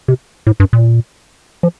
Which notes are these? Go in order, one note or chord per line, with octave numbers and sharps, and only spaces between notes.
C3
A2
G2
A#2
F3